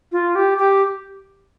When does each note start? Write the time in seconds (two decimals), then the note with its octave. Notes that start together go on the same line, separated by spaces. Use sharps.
0.12 F4
0.35 G4
0.57 G4